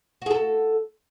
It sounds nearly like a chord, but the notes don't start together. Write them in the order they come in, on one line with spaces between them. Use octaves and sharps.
F#4 G#4 A4